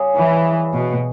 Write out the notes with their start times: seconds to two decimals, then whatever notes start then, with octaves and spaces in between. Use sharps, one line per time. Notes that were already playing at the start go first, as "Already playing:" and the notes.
Already playing: C#3 G3 C#4 G#4
0.15 E3
0.74 B2